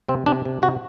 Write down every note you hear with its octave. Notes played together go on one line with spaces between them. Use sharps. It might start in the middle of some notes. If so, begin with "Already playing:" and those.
C3 C4
C3 D4
C3
C3 F#4